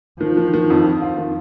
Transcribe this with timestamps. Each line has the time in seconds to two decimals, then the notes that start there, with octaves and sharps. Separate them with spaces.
0.21 D#3 F3
0.37 D#3
0.54 D#3
0.70 F2
0.86 F2
1.02 F4
1.17 D#3